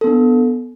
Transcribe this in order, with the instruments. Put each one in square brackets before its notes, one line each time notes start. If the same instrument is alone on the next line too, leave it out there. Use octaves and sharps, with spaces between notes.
[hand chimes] A4
B3
D4